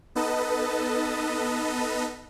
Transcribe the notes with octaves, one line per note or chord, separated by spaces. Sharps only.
B3 D#4 A4 B4 D#5 A5